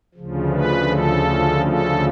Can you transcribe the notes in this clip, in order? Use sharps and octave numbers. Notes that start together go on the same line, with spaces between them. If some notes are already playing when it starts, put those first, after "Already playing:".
D2 C#3 F3
B4
A4
A4